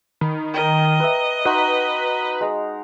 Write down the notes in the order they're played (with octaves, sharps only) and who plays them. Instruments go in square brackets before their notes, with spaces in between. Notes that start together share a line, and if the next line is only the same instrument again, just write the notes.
[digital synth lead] D#3 [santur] B5
[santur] A#4 G5 [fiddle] D#5
[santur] B4 E5
[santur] D#4 F#4 C6 [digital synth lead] B4
[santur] G#3 A#5